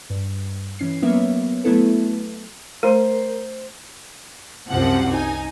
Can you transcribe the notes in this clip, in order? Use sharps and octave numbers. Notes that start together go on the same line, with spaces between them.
G2
E3 C#4 C7
F#3 A#3 B3 C#4 C#5 E5
F#3 A3 B3 E4 A4
A3 A#4 C5 C6
C2 F#2 C3 F3 F#5
D#4 G#5